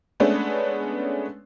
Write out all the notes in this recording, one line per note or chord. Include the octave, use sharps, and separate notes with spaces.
G#3 A3 B3 C#4 D4